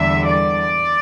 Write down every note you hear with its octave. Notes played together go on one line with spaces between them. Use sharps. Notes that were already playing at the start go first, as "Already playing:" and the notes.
Already playing: E2 D3 G3 E5
D5